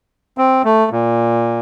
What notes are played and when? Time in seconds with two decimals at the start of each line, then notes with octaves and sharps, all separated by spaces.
0.38 C4
0.65 A3
0.92 A#2